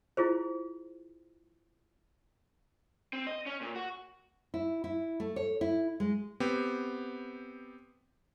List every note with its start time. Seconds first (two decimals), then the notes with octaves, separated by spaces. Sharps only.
0.17 E4 F4 G#4 C5
3.13 C4
3.27 D#5
3.46 C#4
3.61 A#2
3.75 F#4
4.54 E4
4.84 E4
5.20 A3
5.36 C#5
5.61 E4
6.00 G#3
6.40 B3 C4 G4